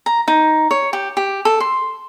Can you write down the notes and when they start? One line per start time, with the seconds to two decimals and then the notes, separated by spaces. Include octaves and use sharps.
0.06 A#5
0.28 D#4
0.71 C#5
0.93 G4
1.17 G4
1.45 A4
1.60 C6